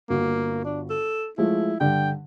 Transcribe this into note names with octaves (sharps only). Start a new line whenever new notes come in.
G1 A#3 F#4
D4
A4
F3 G#3 A3 E4
G2 D3 G5